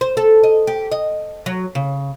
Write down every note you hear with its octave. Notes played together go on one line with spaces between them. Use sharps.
C5
A4
D#5
G4
D#5
F#3
C#3